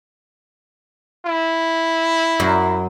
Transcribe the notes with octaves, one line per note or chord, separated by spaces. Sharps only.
E4
F#2